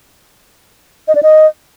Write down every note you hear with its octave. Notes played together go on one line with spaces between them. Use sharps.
D#5
D5
D#5